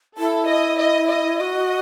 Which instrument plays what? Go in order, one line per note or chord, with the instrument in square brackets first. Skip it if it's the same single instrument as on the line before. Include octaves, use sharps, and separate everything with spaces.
[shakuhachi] E4 [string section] A4
[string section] D#5
D#5
D#5
[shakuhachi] F#4 [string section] D#5